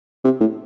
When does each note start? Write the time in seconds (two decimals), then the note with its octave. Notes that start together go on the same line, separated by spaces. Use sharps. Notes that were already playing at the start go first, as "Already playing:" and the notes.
0.25 C3
0.40 A2